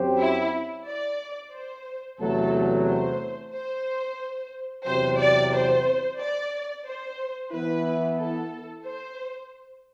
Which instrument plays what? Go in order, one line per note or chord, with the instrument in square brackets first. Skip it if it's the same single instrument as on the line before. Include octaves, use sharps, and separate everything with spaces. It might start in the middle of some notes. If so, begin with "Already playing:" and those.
Already playing: [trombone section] F#2 F#3 C4 G4 C5
[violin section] E4
D5
C5
[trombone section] E2 C3 F#3 A3 [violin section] A4
[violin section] C5
C5
[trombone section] E2 C3 F#3 [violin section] C5
[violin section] D5
C5
D5
C5
[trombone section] E3 B3 E4 [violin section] B4
[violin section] A4
C5